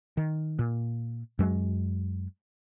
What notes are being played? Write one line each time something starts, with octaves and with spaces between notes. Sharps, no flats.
D#3
A#2
F#2 F#3 G#3